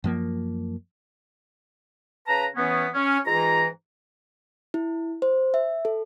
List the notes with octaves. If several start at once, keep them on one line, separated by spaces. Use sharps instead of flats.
F#2 F3 A#3
C#3 B4 A5 A#5
E3 B3 C#4
C#4
G#2 E3 F4 A#5
E4
C5
E5
A4